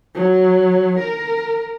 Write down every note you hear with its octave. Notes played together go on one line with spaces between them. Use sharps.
F#3
A#4